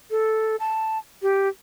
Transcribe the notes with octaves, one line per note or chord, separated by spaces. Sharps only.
A4
A5
G4